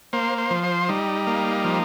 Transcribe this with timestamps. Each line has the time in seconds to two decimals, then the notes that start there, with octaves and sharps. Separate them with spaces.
0.13 A#3 C5
0.38 C5
0.51 F3
0.64 C5
0.89 G3 D#4
1.27 A#3
1.65 F3